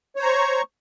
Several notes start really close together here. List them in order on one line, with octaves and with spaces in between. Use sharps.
C#5 C5 A#5 C#6